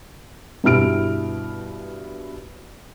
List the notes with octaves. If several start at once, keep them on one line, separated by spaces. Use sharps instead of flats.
G2 B2 E4 F6 D7